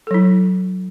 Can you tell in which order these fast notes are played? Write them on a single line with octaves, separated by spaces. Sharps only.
A4 F#3 E4